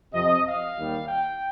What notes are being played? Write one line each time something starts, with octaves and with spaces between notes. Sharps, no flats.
F2 C3 F3 D#5
F5
D#2 D#3 G3
G5